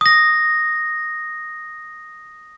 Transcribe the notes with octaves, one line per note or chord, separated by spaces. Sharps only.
D#6 A#6